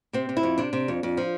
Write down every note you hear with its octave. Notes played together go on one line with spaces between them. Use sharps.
C3 C4
C3
E4
F2
C3 D4
C3
F2
F2
F3